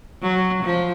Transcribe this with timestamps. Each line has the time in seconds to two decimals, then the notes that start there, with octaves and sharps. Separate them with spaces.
0.22 F#3
0.63 F3